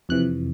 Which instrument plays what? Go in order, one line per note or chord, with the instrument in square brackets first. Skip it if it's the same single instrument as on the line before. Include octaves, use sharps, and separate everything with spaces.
[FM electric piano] F2 C3 E3 F#6